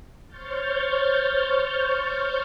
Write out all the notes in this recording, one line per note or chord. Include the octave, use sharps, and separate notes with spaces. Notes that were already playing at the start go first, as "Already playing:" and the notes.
C5 C#5 C#6 F6 G6 A6